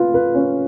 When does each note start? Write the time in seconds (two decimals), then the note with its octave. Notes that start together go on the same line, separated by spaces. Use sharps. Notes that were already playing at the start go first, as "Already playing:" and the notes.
Already playing: F4 B4
0.14 B4
0.34 C#4